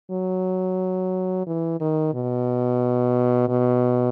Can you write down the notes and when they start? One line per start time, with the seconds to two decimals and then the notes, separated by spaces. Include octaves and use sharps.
0.11 F#3
1.47 E3
1.81 D#3
2.14 B2
3.49 B2